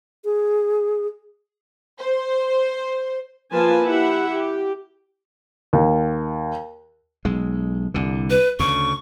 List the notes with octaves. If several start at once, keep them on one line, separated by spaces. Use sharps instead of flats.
G#4
C5
F3 A#3 F4 B4 G#5 A5
E4 G4 E5 F#5
G4
D#2
B1 G#3
C2 D3
B4
D2 C#3 C#6